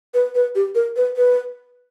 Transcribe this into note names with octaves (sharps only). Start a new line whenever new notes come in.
B4
B4
G4
A#4
B4
B4